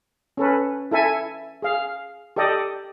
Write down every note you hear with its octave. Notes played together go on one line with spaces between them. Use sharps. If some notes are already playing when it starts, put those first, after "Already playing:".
C#4 A4 B4
E4 A4 E5 G#5
G#4 F5
G4 A4 D5 D#5